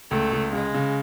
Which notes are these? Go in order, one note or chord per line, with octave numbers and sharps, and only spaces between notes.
C#2 A3
C#2
C#3 G#3
C#3